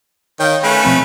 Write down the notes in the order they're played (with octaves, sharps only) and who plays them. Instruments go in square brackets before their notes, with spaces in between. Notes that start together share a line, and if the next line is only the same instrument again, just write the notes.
[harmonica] D#3 G5 [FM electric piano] C#5 F5
[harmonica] A3 C#4 B4
[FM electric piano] B2 F3 C4